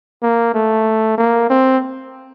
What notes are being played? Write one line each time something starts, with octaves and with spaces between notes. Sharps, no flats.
A#3
A3
A#3
C4